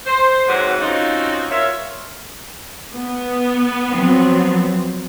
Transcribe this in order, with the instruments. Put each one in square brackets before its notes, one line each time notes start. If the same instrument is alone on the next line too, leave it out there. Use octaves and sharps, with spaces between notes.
[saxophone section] C5
G#2 C3 F#3 F#4 B4
C4 C#4 D#4 F4 F#4
F4 A#4 C#5 E5
[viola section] B3
[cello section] F3 F#3 C4